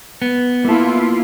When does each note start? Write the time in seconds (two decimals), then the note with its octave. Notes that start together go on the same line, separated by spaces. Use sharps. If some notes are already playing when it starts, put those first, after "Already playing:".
0.22 B3
0.65 A#3 E4 F4 A4